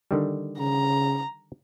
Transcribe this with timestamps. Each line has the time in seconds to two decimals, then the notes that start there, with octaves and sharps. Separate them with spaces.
0.11 D3 D#3 G3
0.59 C#3 A#5